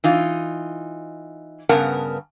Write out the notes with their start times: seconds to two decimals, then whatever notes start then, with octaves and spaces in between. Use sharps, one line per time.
0.04 E3 D#4 F4
1.69 G2 C#3 B3 A#4 F#5 A5